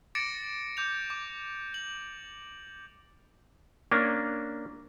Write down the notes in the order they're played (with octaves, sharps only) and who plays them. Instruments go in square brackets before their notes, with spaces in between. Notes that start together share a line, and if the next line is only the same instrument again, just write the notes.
[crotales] D6 A6 A#6 C#7 D7 E7
D6 G6 F7
D6
F#7
[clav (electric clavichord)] A#3 C#4 D4